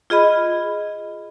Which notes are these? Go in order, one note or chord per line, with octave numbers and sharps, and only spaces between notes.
F4 G#4 D#5 B5